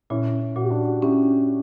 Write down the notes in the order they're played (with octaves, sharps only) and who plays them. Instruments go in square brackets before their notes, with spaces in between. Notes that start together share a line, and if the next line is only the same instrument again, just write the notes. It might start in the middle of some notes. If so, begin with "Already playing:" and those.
[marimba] A#2 [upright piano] C#4 E4
[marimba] A#2 [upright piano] F#4
[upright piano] G4
D4 F#4
[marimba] C#4 [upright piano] E4 G4